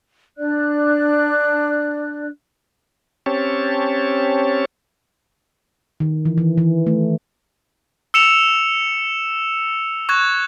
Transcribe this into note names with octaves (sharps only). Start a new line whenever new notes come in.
D4 D5 F#6
C4 C#4 G4 C#5 A5
D#3
E3
E3
E3
A3
E6 C#7 E7 F7
C#6 F#6 G#6